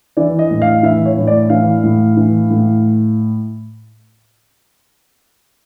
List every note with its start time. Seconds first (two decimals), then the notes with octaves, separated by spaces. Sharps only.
0.17 E3 D5
0.39 D#5
0.51 A2
0.62 F5
0.83 E3 E5
1.06 C#5
1.17 A2
1.27 D5
1.50 E3 F5
1.84 A2
2.17 E3
2.50 A2